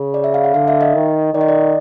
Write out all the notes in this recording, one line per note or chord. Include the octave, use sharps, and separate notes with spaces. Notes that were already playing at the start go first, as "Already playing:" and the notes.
Already playing: C#3
D5
E5
F5
F#5
D3 F5
E5
D#5
D#3
D#3 D5
D#5
D5